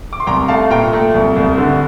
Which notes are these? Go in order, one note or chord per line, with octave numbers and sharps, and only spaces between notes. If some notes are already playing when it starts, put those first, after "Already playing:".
D6
C6
C2 G5 A#5
A3 F5 A5
A#2 G5 A#5
A3
C2
C2
D3